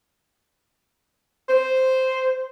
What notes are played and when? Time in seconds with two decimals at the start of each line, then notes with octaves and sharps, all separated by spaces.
1.49 C5